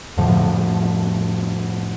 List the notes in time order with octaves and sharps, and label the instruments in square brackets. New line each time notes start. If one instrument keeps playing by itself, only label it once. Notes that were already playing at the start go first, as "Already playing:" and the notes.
[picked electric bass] F2 A2 D3 F3